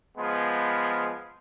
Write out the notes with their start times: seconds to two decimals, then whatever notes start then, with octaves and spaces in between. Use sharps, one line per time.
0.18 F3 G#3 B3